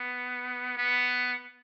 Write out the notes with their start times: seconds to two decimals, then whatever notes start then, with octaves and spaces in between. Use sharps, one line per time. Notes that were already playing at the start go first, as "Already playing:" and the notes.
Already playing: B3
0.77 B3